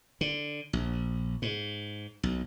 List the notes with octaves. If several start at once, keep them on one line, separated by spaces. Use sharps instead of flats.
D3
A#1
G#2
B1